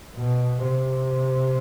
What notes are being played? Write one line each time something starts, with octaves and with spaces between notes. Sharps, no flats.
B2
C3